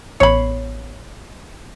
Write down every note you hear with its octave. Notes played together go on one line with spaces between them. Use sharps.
A1 B3 C#5 B5 C7